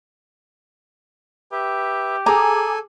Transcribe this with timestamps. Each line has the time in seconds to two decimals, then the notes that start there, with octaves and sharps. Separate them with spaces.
1.52 G4 B4 E5
2.26 G#4 A4 G#5 A#5 D6